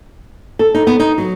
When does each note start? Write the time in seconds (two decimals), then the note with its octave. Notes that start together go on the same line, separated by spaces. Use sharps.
0.59 A4
0.74 D#4
0.87 B3
0.99 D#4
1.18 F#3